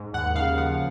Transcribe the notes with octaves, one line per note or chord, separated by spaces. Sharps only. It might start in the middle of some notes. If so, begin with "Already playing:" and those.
Already playing: G#2
D#2 F#5
C#3 F5
F3 F#5